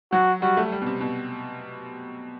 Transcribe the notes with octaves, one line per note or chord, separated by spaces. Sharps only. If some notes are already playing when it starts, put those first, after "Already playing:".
F#3 F#4
G3 F#4
A3
G3
B2
C3
B2